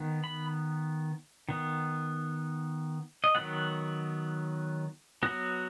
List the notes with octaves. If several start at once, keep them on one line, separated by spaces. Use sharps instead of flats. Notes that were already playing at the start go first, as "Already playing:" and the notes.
Already playing: D#3 B3
B5
D#3 B3
D#5
D#3 F#3 B3 F#5
F#3 B3 F#4